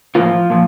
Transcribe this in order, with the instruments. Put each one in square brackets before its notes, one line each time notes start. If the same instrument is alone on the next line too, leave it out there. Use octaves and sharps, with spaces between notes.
[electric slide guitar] A2 E3 F3 A#3 F4
A#2 F3